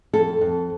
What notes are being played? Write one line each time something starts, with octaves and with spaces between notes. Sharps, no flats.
F2 A4
F2